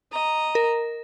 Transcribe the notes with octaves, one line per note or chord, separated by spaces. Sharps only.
D#5 A#5
A#4